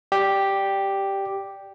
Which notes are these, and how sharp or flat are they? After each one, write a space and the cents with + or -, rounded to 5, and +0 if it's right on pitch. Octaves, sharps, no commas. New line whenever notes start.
G4 +0 D5 +0